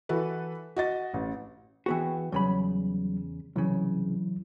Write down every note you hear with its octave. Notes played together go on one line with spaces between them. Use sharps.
E3 F#4 A4 B4
F#4 D#5 A6
A1
E3 B3 F#4 G#4 G5
E2 C#3 F#3 G3 B5
C2 C#3 E3 F#3 E4